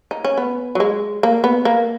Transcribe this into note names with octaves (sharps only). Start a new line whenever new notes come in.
D#4
C#4
B3
F#3
G#3
A#3
B3
A#3